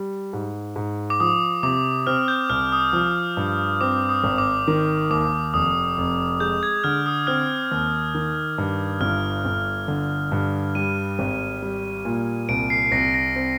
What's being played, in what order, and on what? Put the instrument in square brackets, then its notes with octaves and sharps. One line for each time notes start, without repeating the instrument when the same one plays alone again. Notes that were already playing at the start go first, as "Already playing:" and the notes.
Already playing: [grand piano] G3
G#2
G#2
[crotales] D6
[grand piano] F3 [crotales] D#6
[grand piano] C3 [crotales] D6
[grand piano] C4 [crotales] F6
[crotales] G6
[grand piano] C2 [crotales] F6
[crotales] D#6
[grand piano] F3
G2
[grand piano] C4 [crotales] D6
[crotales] D#6
[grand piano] G#1
[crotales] D6
[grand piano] D#3
[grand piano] D#2 [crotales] D6
[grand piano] F1 [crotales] D#6
[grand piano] F1
[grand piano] G#3 [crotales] G6
[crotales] G#6
[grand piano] D3 [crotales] F6
[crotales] D#6
[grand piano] C4 [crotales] F6
[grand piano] D#2
D#3
G2
[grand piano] G1 [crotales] F6
[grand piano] G1
D3
G2
[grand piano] G3 [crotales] D#7
[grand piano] G#1
G3
A#2
[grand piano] C2 [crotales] D7
[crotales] C7
[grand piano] C2 [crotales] A#6
[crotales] A#6
[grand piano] C4